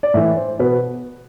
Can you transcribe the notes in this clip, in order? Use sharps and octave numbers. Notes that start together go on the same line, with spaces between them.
D5
A2 E3 E5
C5
B2 B4